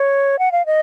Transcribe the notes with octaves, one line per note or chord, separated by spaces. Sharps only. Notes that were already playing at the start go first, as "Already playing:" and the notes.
Already playing: C#5
F#5
F5
D#5